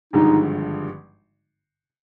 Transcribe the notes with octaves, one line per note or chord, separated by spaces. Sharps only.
G#1 G2 D3 F3 G#3 D#4